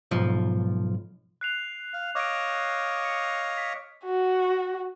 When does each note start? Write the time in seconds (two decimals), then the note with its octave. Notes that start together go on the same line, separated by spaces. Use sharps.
0.11 B1 G#2 F3
1.41 F#6 C7 F7
1.93 F5
2.15 C#5 D#5 F5 D6 D7
3.05 C#7
3.58 B6
4.04 F#4